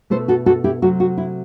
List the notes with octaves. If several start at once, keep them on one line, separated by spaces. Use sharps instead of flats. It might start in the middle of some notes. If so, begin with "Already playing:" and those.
B2 A3 E4 A4 C5
F#4 A4
F#4 A4
E4 G4
C3 F#3 A3 F#4
F#4
E4